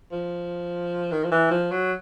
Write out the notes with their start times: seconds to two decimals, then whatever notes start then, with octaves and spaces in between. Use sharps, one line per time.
0.12 F3
1.12 D#3
1.24 F3
1.32 E3
1.51 F3
1.71 F#3